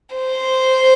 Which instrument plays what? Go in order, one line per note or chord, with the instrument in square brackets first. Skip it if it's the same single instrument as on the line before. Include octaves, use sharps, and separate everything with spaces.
[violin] C5